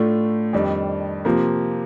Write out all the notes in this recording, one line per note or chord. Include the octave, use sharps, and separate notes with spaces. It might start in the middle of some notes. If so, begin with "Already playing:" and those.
Already playing: A2 A3 D4 F4
F2 D#3 G3 D4
C3 F3 A#3